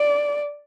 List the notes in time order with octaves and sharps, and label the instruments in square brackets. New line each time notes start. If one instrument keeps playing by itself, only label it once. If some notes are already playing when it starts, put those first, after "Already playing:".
Already playing: [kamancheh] D5